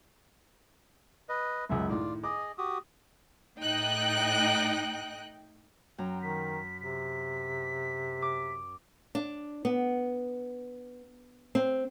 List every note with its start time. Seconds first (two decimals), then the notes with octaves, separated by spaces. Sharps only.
1.29 B4 D#5
1.69 C#2 F#2 E5
1.90 A2 D#3 F4 D5
2.24 G#4 D#5 D6
2.58 F#4 G4 D#6
3.59 A2 D#4 D#5 G5 F#6
5.98 F#2 G5 A#5
6.22 D#3 B6
6.81 C3 B6
8.22 D6
9.15 D4
9.65 B3
11.55 C4